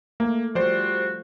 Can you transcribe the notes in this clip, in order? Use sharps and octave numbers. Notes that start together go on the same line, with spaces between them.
A3 A#3
F3 G3 F#4 C5 D5